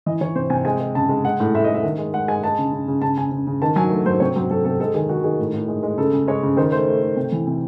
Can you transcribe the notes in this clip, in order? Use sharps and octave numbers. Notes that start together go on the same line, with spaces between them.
E3 D#5
E3 C#5
C3 C5
C3 G#5
G#3 G#5
G#3
C#3 A5
G#3
G#3 F#5
A2
A2 E5
D#5
A2
E5
D#3
G#3
G#3 F#5
G#3 G#5
G#3 A5
C#3
C#3
C#3
C#3 A5
C#3 G#5
C#3
C#3
D#3 A5
F#3 G#5
A3 A4
F#3 C5
C3 C#5
F#3 C5
F#3 A4
C3 A4
G#3 A4
D#3 G#4
D#3 F#4
D#3 G#4
A2
A2
G#3
G#3
C#3 A4
C#3
G#3 C#5
C#3
D#3 C5
A3 C5
A3
A3
C3
E3
C3